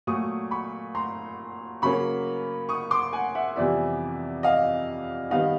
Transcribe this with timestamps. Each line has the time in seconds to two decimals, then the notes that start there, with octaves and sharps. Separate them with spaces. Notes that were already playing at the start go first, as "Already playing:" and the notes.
0.07 A#2 F#3 A3 C#6 D#6
0.51 B5 C#6
0.95 A#5 C6
1.82 C#3 F#3 A#3 C#4 B5 C#6
2.69 C#6 D#6
2.91 C6 D6
3.13 F#5 G#5
3.35 E5 F#5
3.56 F2 C3 E3 G3 B3 D5 E5
4.43 D#5 F5
5.30 D#3 G3 B3 D#4 D#5 F5